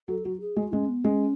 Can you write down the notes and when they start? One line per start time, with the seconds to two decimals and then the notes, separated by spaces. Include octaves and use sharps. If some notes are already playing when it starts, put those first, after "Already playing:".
0.08 F#3 A4
0.24 F#3 F#4
0.40 G#4
0.56 G#3 F#4
0.72 G#3 C#4
0.88 B3
1.04 G#3 C#4